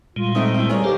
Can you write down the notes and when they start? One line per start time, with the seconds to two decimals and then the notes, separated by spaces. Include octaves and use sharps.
0.16 A#2 G3 G#3 F4
0.35 A3 C4 D#4
0.54 A3 C4 E4
0.69 G3 G#4 A#4 C#5
0.84 D#3 A#3 G4 A4 A#4 C5